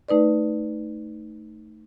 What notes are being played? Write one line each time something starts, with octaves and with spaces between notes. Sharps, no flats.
A3 D#4 B4 D5